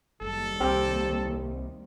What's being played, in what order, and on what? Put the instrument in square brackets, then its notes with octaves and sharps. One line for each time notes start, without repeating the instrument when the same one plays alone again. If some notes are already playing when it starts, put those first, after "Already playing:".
[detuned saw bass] F#1 [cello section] D#2 D#3 G3 [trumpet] A4
[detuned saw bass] C2 [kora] C4 G4 A#4